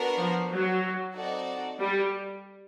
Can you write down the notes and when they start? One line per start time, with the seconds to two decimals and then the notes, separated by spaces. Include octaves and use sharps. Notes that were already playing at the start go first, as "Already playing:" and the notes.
Already playing: B3 D4 F#4 A#4
0.18 F3
0.51 F#3
1.15 C4 D#4 F#4 A4 D5
1.80 G3